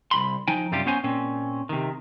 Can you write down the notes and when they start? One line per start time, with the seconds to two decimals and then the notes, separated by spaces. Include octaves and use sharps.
0.11 C2 G2 B5 C6
0.48 F3 D#4 G5 G#5
0.72 F#2 C3 G3 F4 G4
0.86 B3 C#4 C5 G#5
1.04 A#2 C4 C#4
1.69 C3 D#3